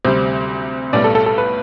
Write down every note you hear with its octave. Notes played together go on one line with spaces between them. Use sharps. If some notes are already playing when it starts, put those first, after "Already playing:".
D2 C3 G3 C5
B1 A2 G3 B3 D5
A4
A4
A4
B4